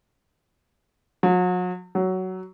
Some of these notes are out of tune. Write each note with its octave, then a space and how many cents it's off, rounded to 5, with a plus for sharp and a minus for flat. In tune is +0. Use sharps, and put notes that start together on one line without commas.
F#3 -40
F#3 +10